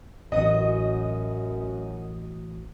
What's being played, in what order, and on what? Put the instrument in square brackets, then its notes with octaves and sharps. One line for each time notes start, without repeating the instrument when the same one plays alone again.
[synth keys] A1 F#4 D#6 [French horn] F#2 [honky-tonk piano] D#5